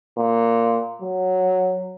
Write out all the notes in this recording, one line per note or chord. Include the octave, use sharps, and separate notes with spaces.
A#2
F#3